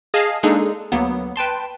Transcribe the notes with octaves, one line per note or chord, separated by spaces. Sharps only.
G#4 D#5 F5 G#5 A5
G#3 A#3 D4 D#4 G#4 A4
D2 F#3 A#3 B3
B4 G5 A5 C6